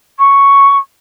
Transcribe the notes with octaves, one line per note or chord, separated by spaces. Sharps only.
C#6